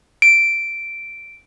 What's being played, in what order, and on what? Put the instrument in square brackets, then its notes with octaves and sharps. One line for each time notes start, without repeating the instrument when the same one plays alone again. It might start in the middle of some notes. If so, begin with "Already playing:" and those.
[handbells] D7